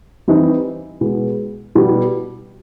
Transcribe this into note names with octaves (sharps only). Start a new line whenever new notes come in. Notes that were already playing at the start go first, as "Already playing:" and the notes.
E3 G3 C4 D#4
B2 G#3 B3
B2 G3 B3